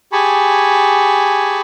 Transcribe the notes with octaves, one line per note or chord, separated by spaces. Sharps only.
G4 G#4 G#5 A5 B5 C#6